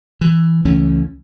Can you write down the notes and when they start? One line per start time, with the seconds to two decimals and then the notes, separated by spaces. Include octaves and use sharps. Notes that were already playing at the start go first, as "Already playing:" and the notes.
0.21 E3
0.65 C#2 E3 A3 C#4